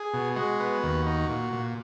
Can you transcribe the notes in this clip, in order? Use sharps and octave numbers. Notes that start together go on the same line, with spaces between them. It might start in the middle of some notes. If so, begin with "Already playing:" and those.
Already playing: G#4
B2
G#3 F#4
B3
D#2
D#4
A#2
A#2